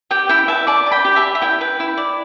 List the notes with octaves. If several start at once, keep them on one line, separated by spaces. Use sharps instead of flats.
G4 G5
E4 G5
B4 E5 A5
D5 A5 D6
D5
G5 B5
G4
E5 A5
G4
E5
E4 G5
B4
E4
D5